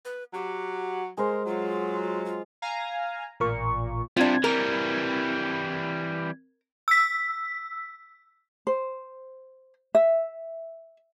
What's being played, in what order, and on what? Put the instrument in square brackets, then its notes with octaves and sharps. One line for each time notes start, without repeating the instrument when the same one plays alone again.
[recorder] B4
[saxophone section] F#3 F#4 [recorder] G4
[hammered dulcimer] G#3 C5 [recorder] A#4
[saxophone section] F#3 [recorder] F4
[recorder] F4
[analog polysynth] F5 G#5 A#5
[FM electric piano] A1 A#4 C#6 [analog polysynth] A#2
[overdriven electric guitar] C3 G3 [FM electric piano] C4 G#6 [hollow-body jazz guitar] D4 F4
[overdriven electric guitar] E3 G3 [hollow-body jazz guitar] A#4
[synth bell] E6 B6
[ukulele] C5
E5